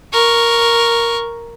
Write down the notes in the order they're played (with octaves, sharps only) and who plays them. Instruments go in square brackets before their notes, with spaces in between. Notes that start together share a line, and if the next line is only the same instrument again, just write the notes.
[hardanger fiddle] A#4 C#6